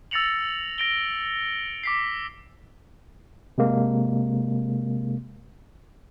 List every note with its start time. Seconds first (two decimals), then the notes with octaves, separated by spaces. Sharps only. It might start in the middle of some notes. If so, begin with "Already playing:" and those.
0.11 E6 A6 A#6 C#7 F7 F#7
0.78 A#6 D7 G7
1.83 D6 B6 C7
3.58 C3 G#3 A#3